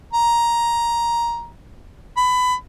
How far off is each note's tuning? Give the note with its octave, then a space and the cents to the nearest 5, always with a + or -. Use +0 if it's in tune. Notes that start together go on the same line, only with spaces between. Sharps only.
A#5 +10
B5 +20